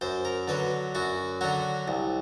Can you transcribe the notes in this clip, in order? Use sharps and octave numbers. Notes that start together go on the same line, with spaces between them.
F#2 C5
A#4
D3 F#3 B4
F#2 F#4
D3 F#3 F#4
C2